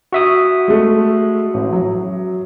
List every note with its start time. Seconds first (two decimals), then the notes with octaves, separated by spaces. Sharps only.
0.13 F#4 E5 D#6
0.68 G#3 A3
1.54 A1
1.73 F#3